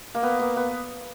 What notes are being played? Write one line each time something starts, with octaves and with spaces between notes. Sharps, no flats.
A#3
B3
A#3
B3